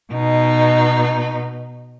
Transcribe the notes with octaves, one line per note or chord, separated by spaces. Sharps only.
B2 D#4